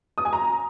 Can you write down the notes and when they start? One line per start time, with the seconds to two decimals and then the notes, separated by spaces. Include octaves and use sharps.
0.18 D#6
0.25 G#5
0.33 A#5